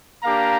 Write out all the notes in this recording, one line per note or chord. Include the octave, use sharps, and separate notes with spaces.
A#3 D4 G4 F5 A#5